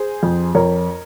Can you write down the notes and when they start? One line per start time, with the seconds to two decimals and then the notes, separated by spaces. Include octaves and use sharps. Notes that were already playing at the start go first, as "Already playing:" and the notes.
Already playing: G#4 C5
0.23 F2
0.55 F2 A#4 C#5